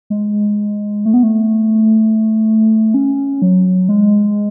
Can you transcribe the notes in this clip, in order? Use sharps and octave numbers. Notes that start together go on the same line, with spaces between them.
G#3
A3
B3
A3
C#4
F#3
G#3